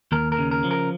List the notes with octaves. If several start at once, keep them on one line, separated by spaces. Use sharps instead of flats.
D#2 A#4
A#4
C#3
A#4
F3
A#4